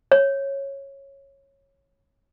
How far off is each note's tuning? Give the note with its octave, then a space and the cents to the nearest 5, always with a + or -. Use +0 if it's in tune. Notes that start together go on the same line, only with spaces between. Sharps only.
C#5 -10